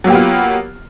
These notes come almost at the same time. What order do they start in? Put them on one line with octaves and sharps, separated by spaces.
F#3 A#3 G4 B3 F4